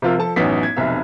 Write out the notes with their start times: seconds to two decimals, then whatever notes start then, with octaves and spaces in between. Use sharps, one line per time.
0.02 C3 F3 F4 A#4 E6
0.18 F3 A4 A5
0.36 A1 F#2 B3 C#4 D#4 B6
0.63 G#6
0.76 F1 B1 C3 E5